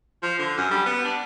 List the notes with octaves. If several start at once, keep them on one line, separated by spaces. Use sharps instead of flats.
F3
D3
F#2
G3
B3
D4